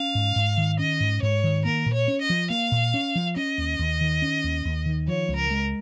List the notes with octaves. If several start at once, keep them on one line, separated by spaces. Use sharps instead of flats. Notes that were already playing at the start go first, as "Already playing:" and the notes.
Already playing: C#4 F5
G#2
G#2
D#3
C#4 D#5
G#2
G#2 C#5
D#3
A#3 A#4
A#2
C#5
C#4
D#5
F3
A#3 F5
A#2
C#4
F3
C#4 D#5
D#2
D#2
D#3
C#4
D#2
D#2
D#3
F3 C#5
C#2
A#4
G#3